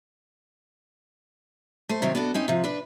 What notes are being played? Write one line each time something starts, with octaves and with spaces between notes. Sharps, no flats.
A3 C5
C3 D#3 F#3 C4
B3 D4 F#4 A4
C4 C#4 D#4
C3 F3
D4 B4